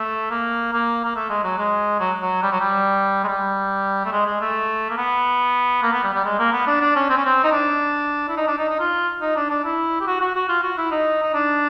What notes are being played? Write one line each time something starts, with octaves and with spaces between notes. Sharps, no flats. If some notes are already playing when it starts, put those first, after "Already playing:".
Already playing: A3
A#3
A#3
A#3
A3
G#3
F#3
G#3
F#3
F#3
G3
F#3
G3
G#3
G3
A3
G#3
G#3
A3
A#3
B3
A#3
B3
G3
G3
G#3
A#3
B3
D4
D4
C#4
C4
C#4
C4
D#4
D4
E4
D#4
D4
D#4
D#4
F4
D#4
D4
D4
E4
G4
F#4
F#4
F#4
F4
F#4
E4
D#4
D#4
D4